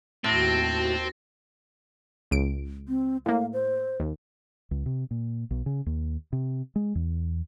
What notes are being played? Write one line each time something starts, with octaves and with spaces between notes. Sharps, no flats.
D#2 A2 C4 F#4 A5 A6 A#6
C#2 D7
C4
A2 A#3 F5
C5
D#2
C#2
C3
A#2
B1
C#3
D#2
C3
G#3
E2